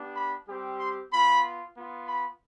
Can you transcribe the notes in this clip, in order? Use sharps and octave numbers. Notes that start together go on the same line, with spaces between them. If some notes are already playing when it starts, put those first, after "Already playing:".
Already playing: B3 D4 G4
B5
G3 C4 G4
C6
B3 F4 B5
B3 F4
B5